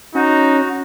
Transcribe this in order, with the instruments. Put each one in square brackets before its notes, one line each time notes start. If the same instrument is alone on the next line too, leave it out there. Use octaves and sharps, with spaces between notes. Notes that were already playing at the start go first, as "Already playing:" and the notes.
[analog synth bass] C#4 [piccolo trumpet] D#4 [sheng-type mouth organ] F#4